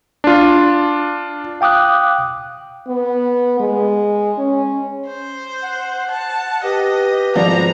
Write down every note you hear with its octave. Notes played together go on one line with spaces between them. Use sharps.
D4 F4
F5 G5 D6 D#6 F#6
B3
G#3
C#4
C5
F#5
A5
G4 B4 D#5
G#1 F3 D5 A#5